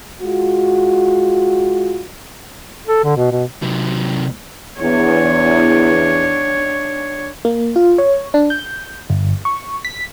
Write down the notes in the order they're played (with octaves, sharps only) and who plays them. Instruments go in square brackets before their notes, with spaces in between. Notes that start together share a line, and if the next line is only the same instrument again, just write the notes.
[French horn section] G#3 F4 F#4
[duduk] A4
D3
B2
B2
[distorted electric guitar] C3 F#3
[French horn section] E2 [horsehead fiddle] D4 C#5
[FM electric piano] A#3
F4
C#5
D4
G6
G1
C#6
B6